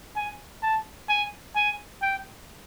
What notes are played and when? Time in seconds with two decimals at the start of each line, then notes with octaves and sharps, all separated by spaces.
0.16 G#5
0.62 A5
1.09 G#5
1.56 G#5
2.02 G5